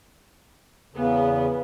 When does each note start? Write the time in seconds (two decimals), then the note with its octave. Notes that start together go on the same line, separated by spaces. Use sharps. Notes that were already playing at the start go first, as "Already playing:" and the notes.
0.94 E2 C#3 B3